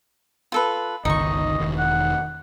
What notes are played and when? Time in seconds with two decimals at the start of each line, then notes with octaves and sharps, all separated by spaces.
0.52 F4 A4 B4
1.05 G1 C#2 D#3 D#4 D#5 C#6
1.60 E1 D#3
1.79 F#5